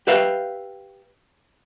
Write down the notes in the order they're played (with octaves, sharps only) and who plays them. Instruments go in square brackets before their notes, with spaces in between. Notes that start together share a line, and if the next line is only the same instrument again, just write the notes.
[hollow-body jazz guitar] G4 B4 E5 F5